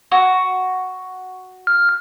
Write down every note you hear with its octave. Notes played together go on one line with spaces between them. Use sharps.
F#4
F6